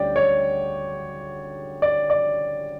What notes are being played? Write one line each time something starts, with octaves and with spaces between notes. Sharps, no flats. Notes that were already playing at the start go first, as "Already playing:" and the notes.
Already playing: D2 D3 G3 C#4 D5 G5
C#5
D5
D5